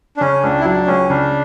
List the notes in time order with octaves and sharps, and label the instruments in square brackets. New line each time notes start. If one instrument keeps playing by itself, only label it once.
[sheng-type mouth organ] D4
[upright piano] C#3 [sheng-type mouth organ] C#4
[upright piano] C#2 [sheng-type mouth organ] D4
[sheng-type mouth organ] E4
[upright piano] F#3 [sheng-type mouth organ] D4
[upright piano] C#2 [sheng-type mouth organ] C#4
[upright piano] C#3 [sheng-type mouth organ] D4